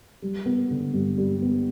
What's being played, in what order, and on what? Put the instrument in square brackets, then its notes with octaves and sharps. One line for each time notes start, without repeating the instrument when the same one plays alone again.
[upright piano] G3
B3
D3
G2
G3
B3